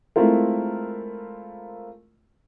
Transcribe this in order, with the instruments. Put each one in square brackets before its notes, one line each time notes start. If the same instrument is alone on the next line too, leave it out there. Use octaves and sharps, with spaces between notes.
[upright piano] G#3 A3 C4 E4 F4 A#4